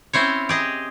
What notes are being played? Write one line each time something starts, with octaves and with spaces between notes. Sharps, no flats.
C4 C#4 E4 C5 C#5
G4 G#4 D#5